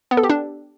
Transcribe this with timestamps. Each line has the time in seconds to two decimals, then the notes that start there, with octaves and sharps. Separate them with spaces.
0.11 B3
0.17 A4
0.23 G4
0.30 D4